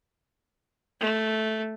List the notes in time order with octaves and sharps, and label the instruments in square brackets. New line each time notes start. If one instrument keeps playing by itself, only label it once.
[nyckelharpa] A3